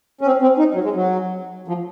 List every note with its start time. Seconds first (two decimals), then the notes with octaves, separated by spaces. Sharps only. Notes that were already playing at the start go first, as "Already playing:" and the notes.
0.21 C#4
0.26 C4
0.42 C4
0.59 D#4
0.74 F#3
0.84 G#3
0.95 F#3
1.68 F3